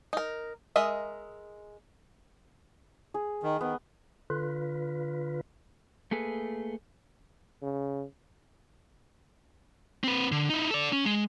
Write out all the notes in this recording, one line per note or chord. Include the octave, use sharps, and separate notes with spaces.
D#4 A#4
G#3 A#4 D#5 E5
G#4
D#3
D#3 B3
D3 F4 B4
A3 A#3 G#4 A4 B4
C#3
C4 B4
D3
D#4 E4
A4 D5
C#4
G#3